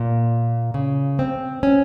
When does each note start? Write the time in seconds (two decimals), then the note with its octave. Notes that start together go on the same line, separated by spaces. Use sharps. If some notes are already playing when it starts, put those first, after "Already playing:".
Already playing: A#2
0.74 C#3
1.19 C4
1.63 C#4